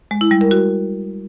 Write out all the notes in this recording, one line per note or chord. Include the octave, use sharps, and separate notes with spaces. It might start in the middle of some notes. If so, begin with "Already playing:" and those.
G#3
E4
G3
A#4
F#4